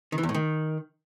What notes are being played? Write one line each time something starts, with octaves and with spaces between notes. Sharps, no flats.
D#3
E3
E2
A2
D#3